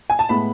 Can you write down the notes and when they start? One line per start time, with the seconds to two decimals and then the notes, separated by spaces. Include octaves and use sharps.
0.10 G#5
0.19 A5
0.29 A2 G#3 B3 B5